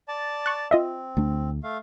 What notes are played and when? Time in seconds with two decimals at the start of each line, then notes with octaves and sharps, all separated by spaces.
0.08 D5 A5
0.46 C#6 F#6
0.71 C4 F4 D#5 E5
1.17 D2 A3 D4
1.63 A3 F5